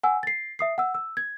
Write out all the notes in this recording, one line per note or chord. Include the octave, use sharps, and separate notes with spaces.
F#5 G#5 E6
A6 C7
E5 D#6 C7
F#5 E6
E6
G#6